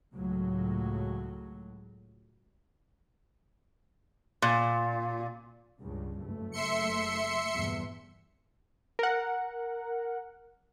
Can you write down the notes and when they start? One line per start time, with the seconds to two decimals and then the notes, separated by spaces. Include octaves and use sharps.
0.14 C#2 A2 F#3
4.42 A#2
5.80 C#2 G2 C#3
6.23 F#1 A3
6.52 E5 C6 C#7
7.54 E2 G2 A#2
8.99 A#4 F#5